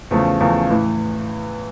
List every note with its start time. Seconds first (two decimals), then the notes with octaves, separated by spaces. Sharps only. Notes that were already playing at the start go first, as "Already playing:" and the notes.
0.11 E2 C#3 F3 A3
0.40 E2 C#3 F3 A3
0.70 A2 E3